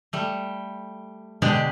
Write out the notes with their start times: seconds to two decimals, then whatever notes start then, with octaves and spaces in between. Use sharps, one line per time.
0.13 G3 A3
1.42 B2 D3 G#3 D4 G4 D5